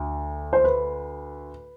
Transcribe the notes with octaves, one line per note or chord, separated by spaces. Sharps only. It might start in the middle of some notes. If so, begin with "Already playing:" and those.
Already playing: D2
C5
B4